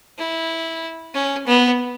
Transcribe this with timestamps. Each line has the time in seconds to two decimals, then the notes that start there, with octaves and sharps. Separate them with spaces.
0.18 E4
1.14 C#4
1.47 B3